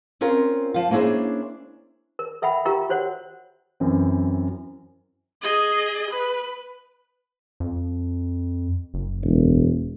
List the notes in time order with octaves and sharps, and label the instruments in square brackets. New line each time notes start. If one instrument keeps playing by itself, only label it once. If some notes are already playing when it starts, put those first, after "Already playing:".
[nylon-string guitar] C4 C#4 F4 A#4
F3 F5
A#3 C#4 D4 E4 G#4 C5
[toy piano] A#4
A4 E5 F#5 G5 B5
F4 G4 A#4 F5 G5
F#4 C5 C#5 F#5
[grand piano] F#2 E3 C4
[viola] G#4 D#5
B4
[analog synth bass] F2
F#1
[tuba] E1